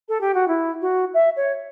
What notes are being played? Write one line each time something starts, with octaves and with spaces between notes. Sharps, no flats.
A4
G4
F#4
E4
F#4
E5
C#5